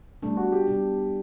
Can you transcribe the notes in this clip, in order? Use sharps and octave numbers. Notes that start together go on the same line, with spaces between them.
B2 G3 A3 D4
F#4
G4
B2 G3 D4